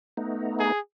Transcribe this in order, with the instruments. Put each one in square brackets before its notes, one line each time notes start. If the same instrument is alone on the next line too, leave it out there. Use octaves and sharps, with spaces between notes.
[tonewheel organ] A3 B3 D#4
[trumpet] G#4